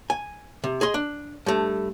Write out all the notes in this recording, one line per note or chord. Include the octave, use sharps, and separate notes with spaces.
G#5
C3
G#4 D#5 C6
D4
G2 A3